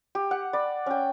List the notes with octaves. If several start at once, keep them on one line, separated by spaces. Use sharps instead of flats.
G4
F#5
D5 B5
C#4 G5